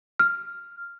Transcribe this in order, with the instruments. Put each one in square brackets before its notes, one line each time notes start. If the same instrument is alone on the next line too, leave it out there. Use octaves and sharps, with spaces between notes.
[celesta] F6